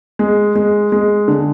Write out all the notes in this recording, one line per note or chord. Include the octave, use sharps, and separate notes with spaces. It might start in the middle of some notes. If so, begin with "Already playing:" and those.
G#3
G#3
G#3
D3